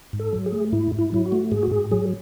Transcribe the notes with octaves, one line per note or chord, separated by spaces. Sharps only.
G#2
A4
F#3
G#4
A3
G#2 E4
G#2
E4
F#3 E4
F#4
A3
G#2 G#4
F#4
G#2 G#4
F#3 G#4